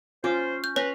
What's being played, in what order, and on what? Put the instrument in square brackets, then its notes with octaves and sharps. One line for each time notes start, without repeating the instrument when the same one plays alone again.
[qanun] C#4 [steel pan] F4 D6 [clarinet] C5
[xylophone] G6
[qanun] C#4 A#5 C6 [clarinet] B4 [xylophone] C#5